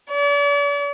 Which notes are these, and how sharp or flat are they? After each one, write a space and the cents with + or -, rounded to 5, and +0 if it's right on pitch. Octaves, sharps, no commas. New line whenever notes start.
D5 -45